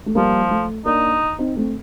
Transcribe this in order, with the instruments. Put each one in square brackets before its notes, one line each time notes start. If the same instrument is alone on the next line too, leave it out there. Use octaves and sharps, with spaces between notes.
[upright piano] A3
[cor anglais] F3 [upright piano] G3 A#3
[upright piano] A3
[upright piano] A#3 D4 [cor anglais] D#4
[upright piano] C4 D#4
A3 C4